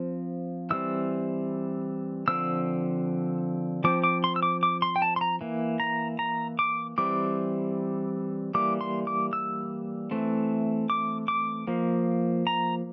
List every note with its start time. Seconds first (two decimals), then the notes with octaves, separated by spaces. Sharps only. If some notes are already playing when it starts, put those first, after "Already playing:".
Already playing: F3 C4
0.70 E3 G3 C4 E6
2.28 D3 F3 C4 E6
3.84 F3 C4 D6
4.04 D6
4.24 C6
4.36 E6
4.43 D6
4.63 D6
4.82 C6
4.96 G5
5.02 A5
5.16 C6
5.21 A#5
5.41 E3 A#3
5.80 A#5
6.19 A#5
6.59 D6
6.98 E3 G3 C4 D6
8.54 E3 G3 A#3 D6
8.81 C6
9.07 D6
9.33 E6
10.11 E3 A3 C4
10.90 D6
11.28 D6
11.67 F3 A#3
12.47 A#5